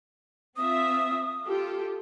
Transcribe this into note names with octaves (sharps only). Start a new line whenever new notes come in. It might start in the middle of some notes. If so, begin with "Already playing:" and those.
C4 F4 E5 D#6
F4 G4 A4